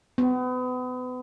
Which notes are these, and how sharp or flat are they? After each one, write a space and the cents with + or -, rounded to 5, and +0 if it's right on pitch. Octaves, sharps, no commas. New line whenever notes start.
B3 +35